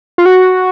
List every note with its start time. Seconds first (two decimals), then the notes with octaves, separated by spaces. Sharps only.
0.18 F4
0.26 F#4